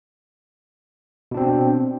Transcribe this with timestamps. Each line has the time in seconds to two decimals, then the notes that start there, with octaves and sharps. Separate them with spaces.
1.31 B2
1.34 D4
1.37 C4